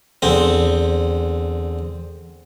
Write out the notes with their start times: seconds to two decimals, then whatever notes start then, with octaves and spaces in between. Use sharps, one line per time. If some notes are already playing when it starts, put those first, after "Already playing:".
0.22 E2 D3 C4